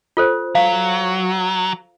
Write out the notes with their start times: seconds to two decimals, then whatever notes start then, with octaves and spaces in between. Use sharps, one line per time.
0.17 F4 A4 C5
0.55 F#3 F5